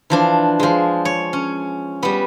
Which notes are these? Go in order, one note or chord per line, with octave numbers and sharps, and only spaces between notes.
E3 F3 D4
F3 G#3
C#5
C#4
G3 B3